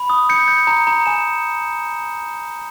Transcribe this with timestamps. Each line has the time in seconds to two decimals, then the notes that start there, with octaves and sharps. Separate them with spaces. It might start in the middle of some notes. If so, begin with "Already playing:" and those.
Already playing: B5
0.10 D#6
0.29 G6 C#7
0.48 G6
0.67 A#5
0.87 A#5
1.06 G#5 E7